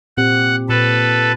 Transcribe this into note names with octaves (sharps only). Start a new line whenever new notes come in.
A#2 C4 G4 F#5
A#2 A4 B4